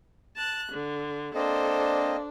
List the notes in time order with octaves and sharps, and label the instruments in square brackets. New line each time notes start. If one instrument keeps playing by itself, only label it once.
[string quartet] A5 F#6
D3
[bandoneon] A#3 C4 D#5 [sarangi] D4 [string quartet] A4 C5